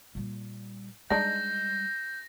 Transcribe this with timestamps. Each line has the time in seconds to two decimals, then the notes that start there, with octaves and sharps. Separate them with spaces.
0.15 A#2 G3
1.10 G3 G#3 D4 D#4 G6 A#6